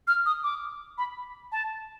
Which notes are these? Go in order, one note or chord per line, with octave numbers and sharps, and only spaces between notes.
F6
D#6
D6
B5
A5